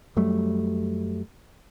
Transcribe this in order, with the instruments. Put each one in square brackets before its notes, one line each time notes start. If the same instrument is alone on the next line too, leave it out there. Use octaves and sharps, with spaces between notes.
[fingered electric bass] F#2 F#3 G3 A3